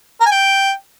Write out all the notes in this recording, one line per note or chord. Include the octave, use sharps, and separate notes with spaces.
A#4
G#5
G5